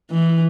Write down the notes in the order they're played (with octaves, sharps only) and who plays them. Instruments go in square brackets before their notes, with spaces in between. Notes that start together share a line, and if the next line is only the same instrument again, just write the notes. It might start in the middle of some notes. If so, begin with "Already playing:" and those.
[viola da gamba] E3